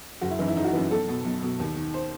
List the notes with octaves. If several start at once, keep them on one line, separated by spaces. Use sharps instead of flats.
F#1 F#4
E4
F#2 E3 D#4
E4
F#1 D#4
F#4
F#2 E3
B1 A4
B2
B1
B2
D#2
D#3
C5